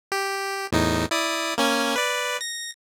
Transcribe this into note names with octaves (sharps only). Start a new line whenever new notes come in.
G4
E2 A2 D#4
E4 D5 D#6
A#3 C#4 G#5
B4 D5
A#6